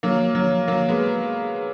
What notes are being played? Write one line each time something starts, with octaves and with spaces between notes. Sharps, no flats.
F#3 A#3
F#3
F#3 A#3
G#3 B3